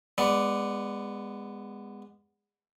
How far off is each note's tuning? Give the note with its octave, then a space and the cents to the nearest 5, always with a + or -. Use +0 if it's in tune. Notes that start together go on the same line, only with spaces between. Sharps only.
G#3 -25 B3 +0 D5 +0